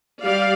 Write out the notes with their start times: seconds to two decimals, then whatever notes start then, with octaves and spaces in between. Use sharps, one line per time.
0.23 G3 D5 F5